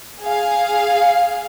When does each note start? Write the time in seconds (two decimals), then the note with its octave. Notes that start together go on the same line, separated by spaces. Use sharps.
0.22 G#4 F5